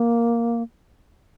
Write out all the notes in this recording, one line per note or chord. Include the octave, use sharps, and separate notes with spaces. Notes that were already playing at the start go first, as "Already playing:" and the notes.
Already playing: A#3